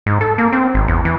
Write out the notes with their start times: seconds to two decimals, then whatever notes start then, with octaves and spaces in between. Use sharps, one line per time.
0.06 G#2
0.21 A4
0.38 A#3
0.53 C4
0.74 G#1
0.88 E2
1.05 E3